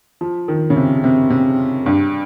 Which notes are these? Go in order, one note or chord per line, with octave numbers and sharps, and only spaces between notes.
F3
D#3
C#3
C3
C3
C3
G2